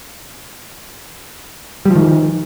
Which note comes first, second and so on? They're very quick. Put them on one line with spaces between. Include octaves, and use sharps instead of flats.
G3 F3 D#3